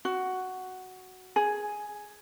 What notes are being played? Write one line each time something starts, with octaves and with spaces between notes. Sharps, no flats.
F#4
G#4